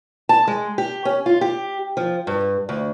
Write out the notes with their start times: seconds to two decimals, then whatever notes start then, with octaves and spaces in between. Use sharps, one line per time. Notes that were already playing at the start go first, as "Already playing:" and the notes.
0.29 A5
0.48 G#3
0.78 G4
1.05 C#4
1.26 F4
1.41 G4
1.97 F3
2.27 G2
2.69 D2